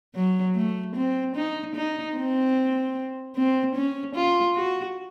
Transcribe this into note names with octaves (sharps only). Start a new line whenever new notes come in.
F#3
A3
C4
D#4
D#4
C4
C4
C#4
F4
F#4